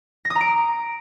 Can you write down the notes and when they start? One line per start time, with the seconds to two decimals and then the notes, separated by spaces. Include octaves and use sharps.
0.25 A#6
0.30 D#6
0.35 A#5
0.41 D7